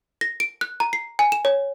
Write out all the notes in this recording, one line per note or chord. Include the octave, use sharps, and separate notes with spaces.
A#6
D7
F#6
A#5
C7
G#5
E7
C#5